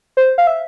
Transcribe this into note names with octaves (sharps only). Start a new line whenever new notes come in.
C5
F5
E5